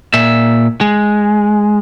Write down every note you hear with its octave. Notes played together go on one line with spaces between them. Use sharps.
A#2 E5
G#3